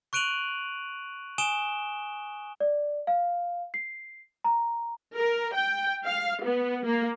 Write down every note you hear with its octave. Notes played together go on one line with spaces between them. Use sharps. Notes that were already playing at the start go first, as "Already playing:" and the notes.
C#6 F#6 D7 D#7 F7 F#7
G#5 D#6 D7 E7 G7
D5
F5
C7
A#5
A#4
G5
F5
B3
A#3